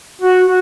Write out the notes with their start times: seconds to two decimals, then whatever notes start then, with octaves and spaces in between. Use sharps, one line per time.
0.22 F#4
0.46 F#4